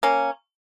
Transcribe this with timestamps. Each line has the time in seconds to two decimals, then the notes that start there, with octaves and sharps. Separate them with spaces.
0.03 A#3 C#4